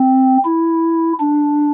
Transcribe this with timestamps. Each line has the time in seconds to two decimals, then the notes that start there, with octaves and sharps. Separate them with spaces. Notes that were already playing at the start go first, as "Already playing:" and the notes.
Already playing: C4
0.45 E4
1.20 D4